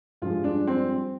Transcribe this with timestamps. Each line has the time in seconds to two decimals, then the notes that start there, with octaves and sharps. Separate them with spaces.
0.22 G2 F3 G#3 F4
0.44 D4
0.67 C4